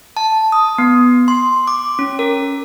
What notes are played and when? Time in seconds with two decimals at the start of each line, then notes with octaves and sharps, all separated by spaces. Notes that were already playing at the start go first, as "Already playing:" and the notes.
0.17 A5
0.52 D#6
0.78 B3
1.28 C6
1.68 D6
1.99 C#4
2.19 A#4